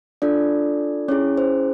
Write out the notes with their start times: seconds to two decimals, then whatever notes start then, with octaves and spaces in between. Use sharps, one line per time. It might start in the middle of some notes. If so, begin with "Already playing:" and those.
0.22 D4 F4 A4 D5
1.08 C#4 E4 G#4 C#5
1.38 C5